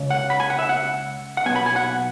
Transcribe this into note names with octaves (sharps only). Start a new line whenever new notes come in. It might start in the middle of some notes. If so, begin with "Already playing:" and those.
Already playing: C#2 C#3
F#5
B5
G#5
F#5
E5
F#5
F#5
B1 B2 B3 G#5
B5
G#5
F#5